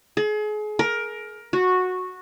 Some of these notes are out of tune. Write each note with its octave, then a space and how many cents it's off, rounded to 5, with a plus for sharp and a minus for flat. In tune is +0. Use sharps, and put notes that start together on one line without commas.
G#4 +35
A#4 +15
F#4 -10